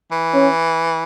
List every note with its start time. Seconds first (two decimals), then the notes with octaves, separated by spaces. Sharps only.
0.12 E3
0.33 C#4